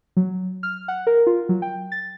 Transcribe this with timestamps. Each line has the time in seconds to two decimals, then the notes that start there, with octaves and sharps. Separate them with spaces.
0.17 F#3
0.63 F6
0.88 F#5
1.07 A#4
1.27 F4
1.49 F#3
1.62 G5
1.92 A6